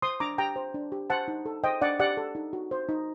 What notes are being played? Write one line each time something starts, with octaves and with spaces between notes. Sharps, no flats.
C5 C6 D#6
D4 A#5 D6
G4 G5 A#5
C5
D4
G4
C5 F#5 A5
D#4
A4
C5 D#5 G5
D4 D5 F#5
G4 D5 F#5
A4
D#4
F#4
C5
D#4